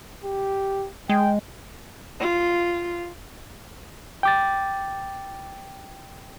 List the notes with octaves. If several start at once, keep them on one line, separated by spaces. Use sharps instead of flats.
G4
G#3 G5
F4
G5 D6 A6